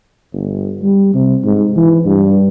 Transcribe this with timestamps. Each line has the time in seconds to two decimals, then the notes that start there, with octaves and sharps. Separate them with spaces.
0.33 G1
0.82 G3
1.14 C3
1.45 G#2
1.76 E3
2.05 G2